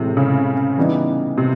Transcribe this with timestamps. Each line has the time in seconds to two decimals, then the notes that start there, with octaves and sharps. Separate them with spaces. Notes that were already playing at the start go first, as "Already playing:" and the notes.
Already playing: A2 C3 E3 G#3
0.17 C#3
0.77 C#3 E3 G3 B3 D#4
1.38 C3